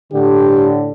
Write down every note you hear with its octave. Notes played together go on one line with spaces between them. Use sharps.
A2 D3 G4